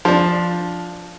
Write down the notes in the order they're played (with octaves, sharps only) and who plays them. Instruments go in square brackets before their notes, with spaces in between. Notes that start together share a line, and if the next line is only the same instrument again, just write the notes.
[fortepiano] F3 D4